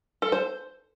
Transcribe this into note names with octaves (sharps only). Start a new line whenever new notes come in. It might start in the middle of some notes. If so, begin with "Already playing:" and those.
A4
C5